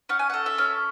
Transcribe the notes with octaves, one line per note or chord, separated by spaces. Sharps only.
C#4 F#5
G#5
A4 F#5
E5
C#4